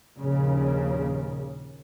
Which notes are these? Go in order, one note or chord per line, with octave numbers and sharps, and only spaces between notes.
A#1 D#2 A#2 C#3